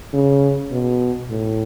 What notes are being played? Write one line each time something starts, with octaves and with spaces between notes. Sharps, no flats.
C#3
B2
A2